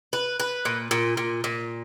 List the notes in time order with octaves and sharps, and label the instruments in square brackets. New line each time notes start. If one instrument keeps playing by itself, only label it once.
[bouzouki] B4
B4
A#2
A#2
A#2
A#2